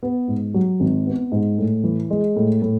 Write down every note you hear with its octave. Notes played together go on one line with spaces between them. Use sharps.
B3
G#2
F#3
G#1
B3
G#2
A2
E3
G#3
A2
A2